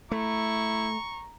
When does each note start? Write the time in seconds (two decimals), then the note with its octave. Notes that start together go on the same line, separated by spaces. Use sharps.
0.11 A3 E4 A#5 C#6